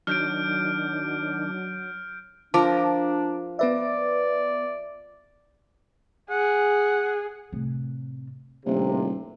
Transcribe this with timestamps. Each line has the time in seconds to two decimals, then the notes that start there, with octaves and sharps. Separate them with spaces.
0.07 D#3 F#3 D4 F6 G6 D7
2.54 F3 D4 A#4 A5 D6
3.59 B3 B4 D5 E5
6.31 G#4 F#5
7.52 A2 C3
8.66 D#1 A#1 A2 C3